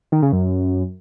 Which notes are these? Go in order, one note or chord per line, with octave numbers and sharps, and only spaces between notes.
D#3
C#3
F#2